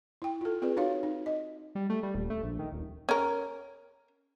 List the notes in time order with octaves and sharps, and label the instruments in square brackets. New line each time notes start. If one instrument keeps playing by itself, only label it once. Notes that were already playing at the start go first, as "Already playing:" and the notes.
[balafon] E4 G5
F4 A4
C4 F4 G#4 B4 D5
D#4 F#4 C#5 F5
D#4
D#5
[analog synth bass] G3
A3
G3
D#1
A3
A#1
D#3
D#1
[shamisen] C#4 A#4